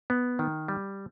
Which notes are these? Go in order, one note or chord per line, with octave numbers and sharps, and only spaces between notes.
B3
D#3
G3